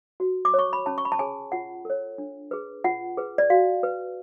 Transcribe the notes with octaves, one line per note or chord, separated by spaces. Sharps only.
F#4
D6
C#5
C#6
B5
C#4 A5
C#6
B5
A5
G#4 C#5 G#5
F4 F#5
A4 C#5
D4
G#4 B4
F4 F#5
G#4 B4
D5
F#4 F5
B4